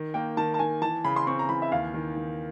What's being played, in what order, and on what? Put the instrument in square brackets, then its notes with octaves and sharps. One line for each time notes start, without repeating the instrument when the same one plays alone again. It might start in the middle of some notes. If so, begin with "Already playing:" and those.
Already playing: [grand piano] D#3
[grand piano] A#3 [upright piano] G5
[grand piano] D#3 [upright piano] A5
[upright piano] A5
[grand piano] D#3 [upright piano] G#5
[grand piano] E3 [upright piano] A5
[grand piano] C#3 [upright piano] B5
[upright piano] C6
[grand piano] C4 [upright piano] C#6
[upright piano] A#5
[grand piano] E3 [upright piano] B5
[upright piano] E5
[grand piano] D#2 [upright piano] F5
[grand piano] D#3
D#3